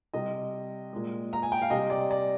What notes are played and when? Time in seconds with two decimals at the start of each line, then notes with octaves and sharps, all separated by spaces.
0.14 C3 G3 D#5
0.93 A#2 G#3
1.33 A#5
1.43 G#5
1.52 G5
1.62 F5
1.70 C3 G3 D#5
1.90 D5
2.11 D5